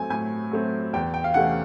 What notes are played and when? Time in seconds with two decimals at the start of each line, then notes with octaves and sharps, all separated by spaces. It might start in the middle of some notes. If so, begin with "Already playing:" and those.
Already playing: A2 F#3 A3 C4 G#5
0.10 A2 G#5
0.51 F#3 A3 C4
0.93 E2 G5
1.14 G5
1.24 F5
1.34 C3 E3 A3 C#4 F#5